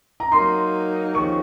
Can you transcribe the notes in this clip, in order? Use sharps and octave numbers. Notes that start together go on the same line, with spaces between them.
A#5
F#3 A#3 D#4 C6
D#2 C#3 F3 C#6